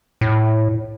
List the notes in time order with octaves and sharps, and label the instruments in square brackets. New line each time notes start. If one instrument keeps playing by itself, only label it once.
[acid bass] A2